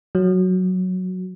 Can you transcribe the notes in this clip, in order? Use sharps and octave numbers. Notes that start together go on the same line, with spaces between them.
F#3